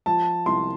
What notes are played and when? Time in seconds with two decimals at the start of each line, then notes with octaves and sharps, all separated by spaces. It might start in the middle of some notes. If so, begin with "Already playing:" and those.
0.06 F3 A5
0.46 C2 C6